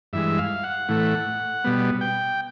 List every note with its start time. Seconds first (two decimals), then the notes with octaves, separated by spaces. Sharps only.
0.13 G2 E3 G#3 E5
0.38 F5
0.64 F#5
0.88 A2 E3 A3
1.64 B2 G3 B3
2.01 G5